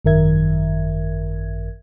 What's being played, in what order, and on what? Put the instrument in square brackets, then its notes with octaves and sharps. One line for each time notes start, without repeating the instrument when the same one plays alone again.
[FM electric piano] G#1 F#2 D#3 A#4 E5 G#6